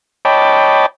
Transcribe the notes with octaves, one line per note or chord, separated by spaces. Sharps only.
C#5 D#5 G5 A5 B5 D6